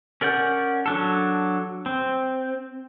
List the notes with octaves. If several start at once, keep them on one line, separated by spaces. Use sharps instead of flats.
C#4 A#4 D5 F#5 G6
F#3 D4 A4
C4